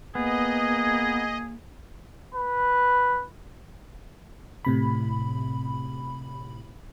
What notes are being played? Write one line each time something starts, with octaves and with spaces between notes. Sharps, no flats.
A#3 B3 G#4 D#5
B4
A2 C3 B5